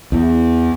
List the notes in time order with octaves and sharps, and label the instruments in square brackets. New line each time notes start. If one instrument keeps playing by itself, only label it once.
[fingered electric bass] E2